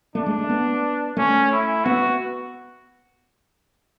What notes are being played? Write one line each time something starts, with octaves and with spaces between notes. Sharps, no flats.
A3 D4
G#3
A3
B3
A3 C#4
E4
B3 F#4